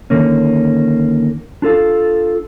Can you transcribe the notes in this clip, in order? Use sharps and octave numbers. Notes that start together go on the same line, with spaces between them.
D3 D#3 A#3 C#4
D4 F4 A4 F5